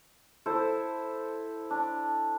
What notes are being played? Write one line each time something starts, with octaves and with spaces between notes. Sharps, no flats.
E4 A4 C5
D4